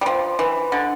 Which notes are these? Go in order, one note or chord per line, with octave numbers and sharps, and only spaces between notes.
G3
F3
E3
D3